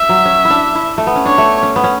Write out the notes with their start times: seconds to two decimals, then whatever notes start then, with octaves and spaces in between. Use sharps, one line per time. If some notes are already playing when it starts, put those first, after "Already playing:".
Already playing: E5
0.09 F#3
0.25 C#4
0.45 E4
0.50 D4
0.75 E4
0.98 A3
1.07 B3
1.16 C#4
1.26 D4 C#5
1.38 A3
1.63 C#4
1.76 B3
1.84 C#4